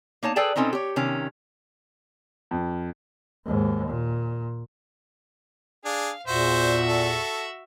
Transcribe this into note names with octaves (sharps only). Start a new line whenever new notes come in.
A#3 D#4 C#5 A5
G#4 A4 B4 D5 G5 A5
B2 C4 C#4 D#4 A4
G4 C#5
C3 D#3 C#4
F2
D#2 G#2
A#2
D4 G#4 F5
E2 A#2 F#4 C5 E5
A4